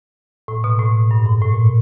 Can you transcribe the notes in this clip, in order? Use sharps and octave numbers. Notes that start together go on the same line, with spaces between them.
A2
B2
A2
G2
G#2
A2
A#2